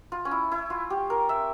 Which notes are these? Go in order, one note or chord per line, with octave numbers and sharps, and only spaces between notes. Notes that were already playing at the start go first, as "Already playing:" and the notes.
F4
C#4
E4
E4
F4
G4
A#4
E5